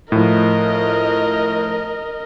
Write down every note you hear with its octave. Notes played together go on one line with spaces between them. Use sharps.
A2 F3 A#4 D#5